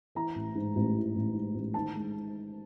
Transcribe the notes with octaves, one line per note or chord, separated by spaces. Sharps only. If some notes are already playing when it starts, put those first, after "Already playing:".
E3 A#5
A1
G#2
A1
E3
A1
G#2
A1
D#3 A5
G#3